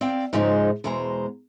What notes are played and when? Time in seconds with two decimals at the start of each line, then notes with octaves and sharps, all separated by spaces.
0.01 C4 D5 F5 G5
0.33 G#2 C#3 F3 G#3 D#4
0.84 E2 B2 G#3 C5 A#5